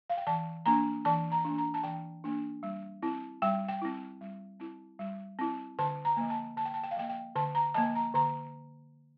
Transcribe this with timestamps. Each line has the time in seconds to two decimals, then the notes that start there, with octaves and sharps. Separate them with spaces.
0.10 F5
0.17 G5
0.27 E3 A5
0.66 A#3 D4 A#5
1.05 E3 A5
1.32 A#5
1.45 A#3 D4
1.58 A#5
1.74 A5
1.83 E3 G5
2.24 A#3 D4
2.63 G3
3.03 C4 E4
3.42 G3 G5
3.69 G5
3.82 C4 E4
4.21 G3
4.60 C4 E4
4.99 G3
5.39 C4 E4
5.79 D3 A5
6.05 A#5
6.17 F3 A#3
6.30 A5
6.56 D3 A5
6.65 G5
6.74 A5
6.83 G5
6.91 F5
6.96 F3 A#3 G5
7.10 G5
7.35 D3 A5
7.55 A#5
7.74 F3 A#3 A5
7.95 A#5
8.14 D3 A#5